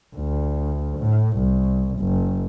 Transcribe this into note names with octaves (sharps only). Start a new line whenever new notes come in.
D2
A2
C2
F#1